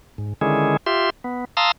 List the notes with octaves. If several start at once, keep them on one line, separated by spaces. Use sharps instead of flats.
G#2
D3 D#3 G#3 C#4 E4 G#4
F4 G4 E5 C6
B3
F5 A5 A#5 C6 D#6 E6